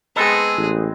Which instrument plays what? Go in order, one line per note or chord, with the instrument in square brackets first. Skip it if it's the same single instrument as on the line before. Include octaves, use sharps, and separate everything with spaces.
[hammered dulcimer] G#3 B3 C4 [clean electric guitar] D#4 A4 [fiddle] G#4
[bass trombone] A1